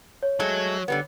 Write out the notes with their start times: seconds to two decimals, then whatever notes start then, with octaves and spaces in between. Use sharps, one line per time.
0.23 C#5
0.40 F#3 G#3 A3
0.88 D3 G3 B3